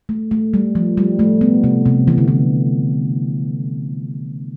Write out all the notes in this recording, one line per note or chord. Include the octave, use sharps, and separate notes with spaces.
A3
A3
G3
F3
G3
A3
B3
C3
C3
E3
D3
E3